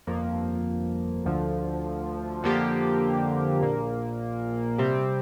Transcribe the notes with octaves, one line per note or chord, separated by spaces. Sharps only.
G1 F2 F3 A#3
D2 D3 F3
F2 D3 F3 A#3 G4
A#1 A#2 A#3
C3 G3 C4 G4